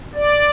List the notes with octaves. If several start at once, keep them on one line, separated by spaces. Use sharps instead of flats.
D5